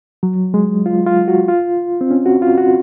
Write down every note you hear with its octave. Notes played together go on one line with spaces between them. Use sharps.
F#3
G#3
F4
F4
F#4
F4
C4
C#4
F#4
F4
F#4